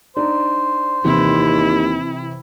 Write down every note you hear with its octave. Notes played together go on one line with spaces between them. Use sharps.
D4 D#4 C5
D#2 C3 E3 E4